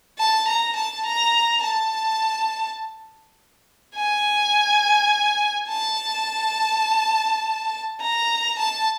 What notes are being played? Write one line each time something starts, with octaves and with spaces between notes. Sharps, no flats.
A5
A#5
A5
A#5
A5
G#5
A5
A#5
A5